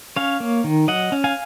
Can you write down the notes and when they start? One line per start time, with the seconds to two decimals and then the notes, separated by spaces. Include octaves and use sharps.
0.16 C#4 C#5 F5
0.40 A#3
0.64 D#3
0.88 F#3 D#5 F#5
1.12 C#4
1.24 F5 G#5